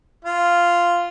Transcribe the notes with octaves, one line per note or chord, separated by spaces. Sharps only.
F4